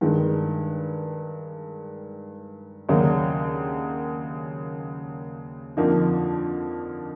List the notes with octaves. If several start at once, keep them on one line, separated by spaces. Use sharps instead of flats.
G2 D#3 G#3
D#2 C#3 F#3 A#3 D4
F2 D3 F3 A#3 D#4